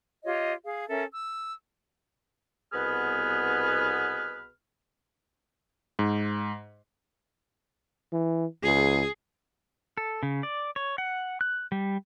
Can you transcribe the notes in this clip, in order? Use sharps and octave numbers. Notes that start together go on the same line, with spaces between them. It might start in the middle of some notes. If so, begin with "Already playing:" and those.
F4 G4 C#5 D#5
G#4 F5
C#4 A4 A#4 E5
E6
C2 B2 B3 G#4 B4 F6
G#2
E3
C#2 G#4
A4
C#3
D5
C#5
F#5
F#6
G3